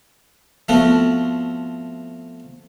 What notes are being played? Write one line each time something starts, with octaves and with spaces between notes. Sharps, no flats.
F3 A3 B3 C4 F4 F#4